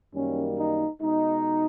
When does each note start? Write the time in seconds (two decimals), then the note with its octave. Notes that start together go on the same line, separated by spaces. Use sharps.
0.13 F#2 D#3 G3 A#3 C#4
0.58 D#4
1.01 B2 G#3 D#4